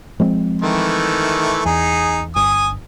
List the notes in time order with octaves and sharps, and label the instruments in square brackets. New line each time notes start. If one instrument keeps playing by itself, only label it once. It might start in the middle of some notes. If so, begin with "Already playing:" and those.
[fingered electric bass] F3 G#3 C4
[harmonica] D#3 E3 A3
[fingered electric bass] E2 [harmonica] D#4 G#4
[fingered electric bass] G1 [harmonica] G#5 D#6